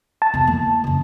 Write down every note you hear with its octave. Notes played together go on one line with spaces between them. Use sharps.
A5
E2 C3
A#3 E4
F#2 C#3